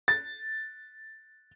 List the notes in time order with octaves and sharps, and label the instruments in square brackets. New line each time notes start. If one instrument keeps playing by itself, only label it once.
[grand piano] A6